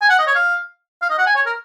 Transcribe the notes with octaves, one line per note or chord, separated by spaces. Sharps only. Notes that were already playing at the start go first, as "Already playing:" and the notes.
G#5
F#5
D#5
C#5
F5
F5
D#5
F#5
G#5
C#5
A#4